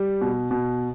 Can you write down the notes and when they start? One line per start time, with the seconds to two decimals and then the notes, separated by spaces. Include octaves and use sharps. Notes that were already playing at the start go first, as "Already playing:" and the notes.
Already playing: G3
0.21 B2
0.51 B2